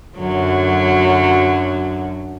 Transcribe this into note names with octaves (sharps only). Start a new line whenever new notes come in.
F#2 D3 F#3